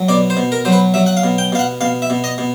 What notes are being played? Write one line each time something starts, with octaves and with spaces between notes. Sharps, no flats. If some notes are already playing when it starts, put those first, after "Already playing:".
Already playing: F#3
B2 D5
C5
B2
A#4
F#3 C5
B4
F#3 E5
F#5
F5
B2
G5
B2 F5
F#5
B2 F5
E5
B2
D#5
B2